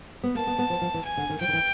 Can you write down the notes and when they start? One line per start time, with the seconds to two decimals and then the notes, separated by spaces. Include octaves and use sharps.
0.23 B3
0.35 A#3 A5
0.47 B3
0.59 B3
0.70 F3
0.82 F3
0.94 E3
1.05 G#5
1.17 D3
1.30 D#3
1.41 F3 G5
1.48 D#3
1.53 E3